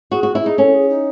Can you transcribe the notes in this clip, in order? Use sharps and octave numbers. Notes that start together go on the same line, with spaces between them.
F#4 G#4
F#4
E4
D#4 G#4
C#4 A4
G#4
D#4